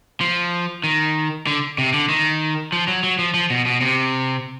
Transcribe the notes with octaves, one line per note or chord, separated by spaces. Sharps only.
F3
D#3
D3
C3
D3
D#3
F3
F#3
F#3
F3
F3
B2
B2
C3